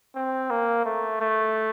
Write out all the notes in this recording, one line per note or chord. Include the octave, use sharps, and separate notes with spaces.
C4
A#3
A3
A3